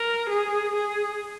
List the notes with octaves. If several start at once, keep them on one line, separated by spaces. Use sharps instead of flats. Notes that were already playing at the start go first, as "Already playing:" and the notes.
Already playing: A#4
G#4
G#4